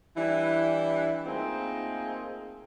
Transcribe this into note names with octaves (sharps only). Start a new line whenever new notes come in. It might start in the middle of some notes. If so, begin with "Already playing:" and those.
E3 G3 D4 E4
A3 A#3 C4 D#4 F4 G#4